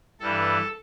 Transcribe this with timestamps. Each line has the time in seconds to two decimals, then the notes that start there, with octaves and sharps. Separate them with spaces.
0.20 G2 E3 G3 A4